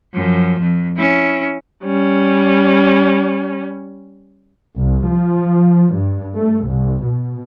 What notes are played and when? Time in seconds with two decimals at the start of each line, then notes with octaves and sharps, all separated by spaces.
0.13 F#2 F3
0.60 F2
0.97 C#4 E4
1.84 G3 C#4
4.78 C2
5.09 F3
5.95 G2
6.37 A3
6.68 C2
7.05 B2